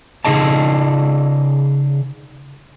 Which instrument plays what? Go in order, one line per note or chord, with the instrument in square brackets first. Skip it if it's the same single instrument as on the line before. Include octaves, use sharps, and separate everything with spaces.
[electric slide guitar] C#3 D#4 G#4 D#5 A5